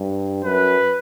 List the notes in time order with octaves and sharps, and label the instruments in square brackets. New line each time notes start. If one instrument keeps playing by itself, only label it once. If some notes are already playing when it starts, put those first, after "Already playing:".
Already playing: [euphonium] G2
[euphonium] F#2 [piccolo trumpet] B4